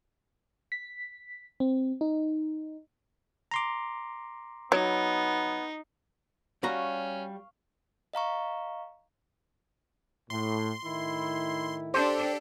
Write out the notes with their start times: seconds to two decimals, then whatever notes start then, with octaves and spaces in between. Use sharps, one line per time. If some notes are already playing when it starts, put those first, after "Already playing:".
0.72 B6
1.60 C4
2.01 D#4
3.51 A#5 C6 D6
4.72 F#3 B3 D#4
6.63 G3 C#4 F#4 F5 A#5 C#6
8.14 D#5 F5 A#5 C#6
10.30 A2 C6
10.84 A2 D#3 E4
11.94 D4 G4 A4 C5